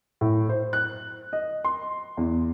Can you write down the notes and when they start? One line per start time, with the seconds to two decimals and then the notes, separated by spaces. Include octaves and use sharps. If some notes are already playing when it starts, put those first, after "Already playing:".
0.21 A2
0.49 C5
0.73 F#6
1.33 D#5
1.64 C6
2.17 E2